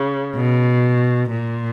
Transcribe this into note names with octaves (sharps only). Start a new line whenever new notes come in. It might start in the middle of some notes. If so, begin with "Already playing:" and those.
Already playing: C#3
B2
A#2